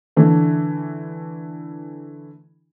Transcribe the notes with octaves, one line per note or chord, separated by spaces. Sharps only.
D3 E3 A3